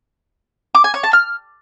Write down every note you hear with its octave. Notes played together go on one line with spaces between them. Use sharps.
D6
G#5
C#5
A5
F6